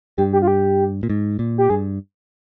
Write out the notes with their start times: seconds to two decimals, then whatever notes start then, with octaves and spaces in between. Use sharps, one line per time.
0.18 G2 G4
0.33 G4
0.42 F4
0.48 G4
1.03 A#2
1.10 G#2
1.39 A#2
1.58 G4
1.70 G2 G#4